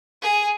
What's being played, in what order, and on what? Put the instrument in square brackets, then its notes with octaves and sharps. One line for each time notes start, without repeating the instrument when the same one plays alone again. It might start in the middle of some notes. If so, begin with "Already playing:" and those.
[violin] G#4